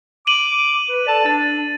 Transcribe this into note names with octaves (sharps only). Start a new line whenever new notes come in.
D6 D#7 F#7
B4
A4 D5 A5
D4 A6